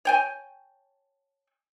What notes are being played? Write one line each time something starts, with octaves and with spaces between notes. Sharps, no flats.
C#5 G5 G#5